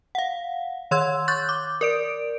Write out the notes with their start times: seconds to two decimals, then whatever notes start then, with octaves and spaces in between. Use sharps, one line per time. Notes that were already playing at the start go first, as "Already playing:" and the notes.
0.15 F5 F#5
0.91 D#3 C#5 C6 E6 G#6
1.28 C#6 F#6 G6 A6
1.49 D6
1.81 A#4 D5 D7